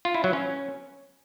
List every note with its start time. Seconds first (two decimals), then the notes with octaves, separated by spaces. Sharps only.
0.05 F4
0.14 E4
0.24 F#3
0.33 C#4